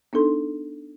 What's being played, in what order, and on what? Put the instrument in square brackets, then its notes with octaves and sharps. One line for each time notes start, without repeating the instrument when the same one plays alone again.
[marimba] B3 D4 D#4 A4 C6